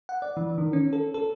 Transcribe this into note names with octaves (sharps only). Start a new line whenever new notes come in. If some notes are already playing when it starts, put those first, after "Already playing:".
F#5
D5
E3
D#3
C#4
A4
A4